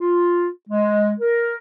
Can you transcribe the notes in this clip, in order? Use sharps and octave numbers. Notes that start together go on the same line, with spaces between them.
F4
G#3
A#4